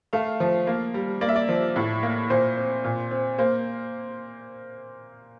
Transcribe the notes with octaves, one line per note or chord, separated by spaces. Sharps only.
A3 F5
F3
A#3
G3
A#3 D5
E5
D5
F3
A2
A#3
A#2 C5
C4
A#2
C4
A#3 C5